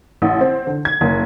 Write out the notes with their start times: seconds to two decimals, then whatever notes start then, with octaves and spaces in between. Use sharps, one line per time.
0.22 A1
0.41 C4
0.67 D3
0.85 G#6
1.01 F#1